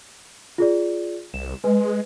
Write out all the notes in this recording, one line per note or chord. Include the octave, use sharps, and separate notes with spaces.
F4 G#4 D5
C2 E7
G#3 B4